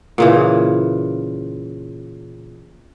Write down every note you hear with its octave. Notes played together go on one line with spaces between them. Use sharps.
A#2 C#3 E3